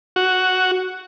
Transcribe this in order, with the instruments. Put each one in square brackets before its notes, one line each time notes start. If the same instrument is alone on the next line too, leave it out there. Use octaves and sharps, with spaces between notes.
[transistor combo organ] F#4